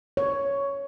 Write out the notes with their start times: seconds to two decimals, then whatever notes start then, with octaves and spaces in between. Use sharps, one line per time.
0.17 C#5